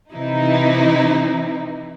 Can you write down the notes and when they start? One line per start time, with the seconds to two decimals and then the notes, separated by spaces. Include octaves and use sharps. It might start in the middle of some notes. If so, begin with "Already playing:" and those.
0.13 C3 E3 D#4 E4